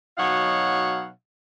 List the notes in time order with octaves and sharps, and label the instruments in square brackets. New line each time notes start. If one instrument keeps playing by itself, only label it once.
[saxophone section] B2 F#3 D#4 C#5 F5 F#5